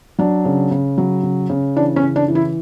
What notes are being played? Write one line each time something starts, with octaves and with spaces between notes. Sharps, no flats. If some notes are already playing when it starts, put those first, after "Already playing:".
F#3 D4
C#3
C#3
F#3
C#3
C#3
E3 D4
C#4
C#3
D4
E3
E4